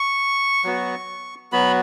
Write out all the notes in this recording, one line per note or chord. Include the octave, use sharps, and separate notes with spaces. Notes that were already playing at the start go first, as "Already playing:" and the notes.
Already playing: C#6
F#3 B3 F#4
F#3 B3 F#4 B5